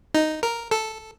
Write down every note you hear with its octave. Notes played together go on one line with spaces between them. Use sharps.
D#4
A#4
A4